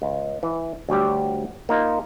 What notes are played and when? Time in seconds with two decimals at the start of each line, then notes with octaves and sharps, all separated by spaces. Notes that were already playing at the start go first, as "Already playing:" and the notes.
0.02 C#2
0.43 E3
0.89 D2 F#3 G3 G4
1.69 A#3 D#4 F4